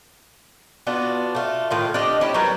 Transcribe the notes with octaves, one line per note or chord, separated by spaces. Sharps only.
B3 D4 F4 F#4
A3 F4
A2 D#3 F4
D4 G4 D#5
C#4 E4 G4
F#3 G3 A#4 B4